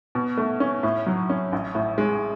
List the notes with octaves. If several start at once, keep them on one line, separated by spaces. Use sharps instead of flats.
B2
A3
C#4
A2
F#3
C#4
A1
A2
G#3